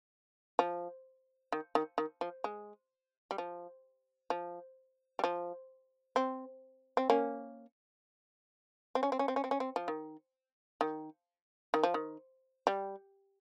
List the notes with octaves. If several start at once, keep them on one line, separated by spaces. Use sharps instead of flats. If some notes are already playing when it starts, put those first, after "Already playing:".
F3
D#3
D#3
D#3
F3
G#3
G3
F3
F3
G3
F3
C4
C4
A#3 C#4
C4
C#4
C4
C#4
C4
C#4
C4
C#4
C4
F3
D#3
D#3
D#3
F3
D#3
G3